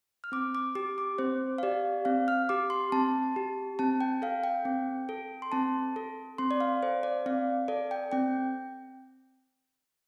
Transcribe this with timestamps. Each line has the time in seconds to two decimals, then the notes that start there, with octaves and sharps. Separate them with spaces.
0.24 F6
0.32 C4 D6
0.55 D6
0.75 G4 D6
0.98 D6
1.18 C4 C5
1.58 F5
1.63 G4 D5
2.05 C4 F5
2.28 F6
2.49 G4 D6
2.70 C6
2.92 C4 A5
3.36 G4
3.79 C4 A5
4.01 G5
4.22 A4 F5
4.44 G5
4.65 C4
5.09 A4
5.42 C6
5.52 C4 A5
5.96 A4
6.38 C4 C6
6.51 D5
6.60 F5
6.83 A4 C5
7.03 D5
7.26 C4 F5
7.68 A4 D5
7.91 G5
8.12 C4 G5